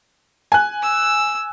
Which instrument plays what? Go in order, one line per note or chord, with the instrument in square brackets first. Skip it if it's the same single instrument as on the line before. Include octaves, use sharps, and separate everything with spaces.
[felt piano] G#5 F#6
[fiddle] E6